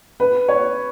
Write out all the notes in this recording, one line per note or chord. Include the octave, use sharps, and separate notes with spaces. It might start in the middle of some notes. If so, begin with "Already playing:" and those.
B4
C#5